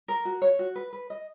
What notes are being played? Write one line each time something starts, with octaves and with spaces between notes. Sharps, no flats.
A#4
F#4
C#5
F#4
B4
B4
D#5